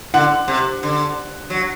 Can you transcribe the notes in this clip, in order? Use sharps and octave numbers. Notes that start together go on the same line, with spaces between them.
D3 F#5
C3
D3
F#3